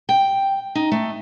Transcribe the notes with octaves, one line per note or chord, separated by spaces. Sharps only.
G5
D#4
A3